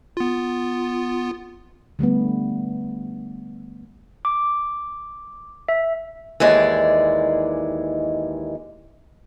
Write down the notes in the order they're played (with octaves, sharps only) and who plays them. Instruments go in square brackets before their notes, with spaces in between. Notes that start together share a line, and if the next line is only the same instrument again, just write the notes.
[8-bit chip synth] B3 F4
[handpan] D3 G3 A3 B3
[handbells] D6
E5
[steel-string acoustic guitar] D#2 E3 G#3 D5